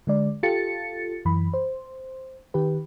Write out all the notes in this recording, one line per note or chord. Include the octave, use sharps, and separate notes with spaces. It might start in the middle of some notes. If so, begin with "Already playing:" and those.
D3 G#3 D5
F4 G4 A4 A6 C#7
F#2 E3 B5
C5
D#3 G4 B4